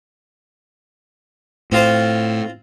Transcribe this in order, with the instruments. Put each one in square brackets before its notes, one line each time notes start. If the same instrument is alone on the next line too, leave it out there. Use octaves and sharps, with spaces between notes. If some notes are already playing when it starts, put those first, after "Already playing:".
[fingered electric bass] A2 [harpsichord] C4 F4 C5